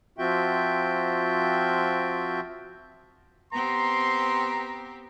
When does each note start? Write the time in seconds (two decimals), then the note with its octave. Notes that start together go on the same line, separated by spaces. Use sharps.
0.18 F3 C4 F4 F#4 E5 G5
3.53 B3 C4 G4 A#5 C6